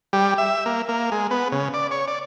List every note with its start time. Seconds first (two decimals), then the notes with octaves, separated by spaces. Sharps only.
0.13 G3
0.38 E5
0.66 A#3
0.89 A#3
1.11 G#3
1.31 B3
1.52 C#3
1.74 D5
1.91 C#5
2.08 D5